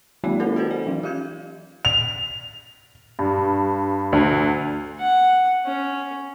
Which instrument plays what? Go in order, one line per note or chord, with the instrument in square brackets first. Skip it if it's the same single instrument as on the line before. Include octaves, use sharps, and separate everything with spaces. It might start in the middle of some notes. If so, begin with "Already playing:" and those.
[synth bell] D#3 F#3 G#3 A#3 C#5 D5
A#3 C#4 E4 A4 B4
F#4 A4 A#4 C5 F#5
D5 G#5
E3 F#3
F4 G4 F5 G6 G#6
[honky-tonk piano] F7
G2
D2
[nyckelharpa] F#5
C#4